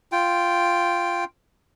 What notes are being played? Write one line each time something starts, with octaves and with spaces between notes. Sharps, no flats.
F4 G5